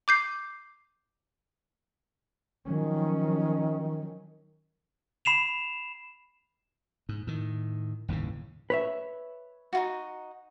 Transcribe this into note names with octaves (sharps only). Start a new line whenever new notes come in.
D6 G6 C7
D#3 F3 F#3 C#4
B5 C7 E7 F7
G#2
A2 D#3
G1 D#2 A2 C#3
B4 C#5 E5
D#4 F4 F#4